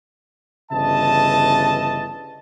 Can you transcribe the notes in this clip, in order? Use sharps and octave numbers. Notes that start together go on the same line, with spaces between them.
G1 C#3 E3 D#5 A5